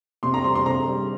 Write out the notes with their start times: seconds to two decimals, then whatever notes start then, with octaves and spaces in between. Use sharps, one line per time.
0.23 C3 C6
0.34 A#5
0.44 G3 C6
0.55 C6
0.65 C3 A#5
0.87 G3